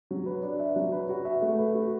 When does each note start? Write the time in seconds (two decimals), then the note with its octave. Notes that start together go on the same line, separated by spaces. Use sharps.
0.11 F#3
0.26 B4
0.43 D4
0.59 E5
0.76 F#3
0.92 B4
1.09 F#4
1.25 E5
1.41 A3
1.58 B4
1.74 F#4